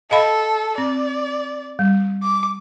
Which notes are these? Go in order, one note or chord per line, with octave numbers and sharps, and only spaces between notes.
A4 D#5 F5 B5
C4 D5
G3
D6